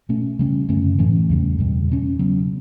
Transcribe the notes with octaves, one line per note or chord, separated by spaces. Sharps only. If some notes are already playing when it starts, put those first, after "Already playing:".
B2 A3 C#4
C#3 G3 C#4
F#2 D3 A3 C#4
A2 E3 A3 C#4
E2 C#3 G3
E2 B2 G3
B2 A3 C#4
C#3 F#3 B3